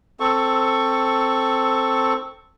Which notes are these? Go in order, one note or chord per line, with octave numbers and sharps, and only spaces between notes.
C4 A4 C#6